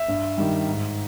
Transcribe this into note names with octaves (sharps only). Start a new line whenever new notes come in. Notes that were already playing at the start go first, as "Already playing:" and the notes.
Already playing: E5
G2
D#3 G3
G#2